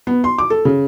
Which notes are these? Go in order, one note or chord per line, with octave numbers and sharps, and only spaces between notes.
B3
C6
D6
A4
C#3